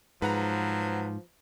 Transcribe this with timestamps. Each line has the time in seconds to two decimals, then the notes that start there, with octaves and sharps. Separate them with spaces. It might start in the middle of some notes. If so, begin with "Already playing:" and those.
0.22 G#2 F3 F#3 B4 F#5 A#5